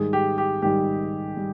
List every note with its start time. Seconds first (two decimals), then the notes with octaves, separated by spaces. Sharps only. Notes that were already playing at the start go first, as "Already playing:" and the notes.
Already playing: G#2 D#3 G3 G#4
0.13 G4
0.38 G4
0.62 G#2 D#3 G3 G4
1.37 G3